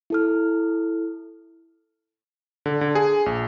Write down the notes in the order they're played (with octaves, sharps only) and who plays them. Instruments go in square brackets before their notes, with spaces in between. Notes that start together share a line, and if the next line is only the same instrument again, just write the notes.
[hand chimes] E4 A4 F6
[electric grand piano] D3
D3
G#4
A#1